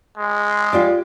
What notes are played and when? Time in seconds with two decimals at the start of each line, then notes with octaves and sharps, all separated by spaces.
0.17 G#3
0.73 F4 G4 D5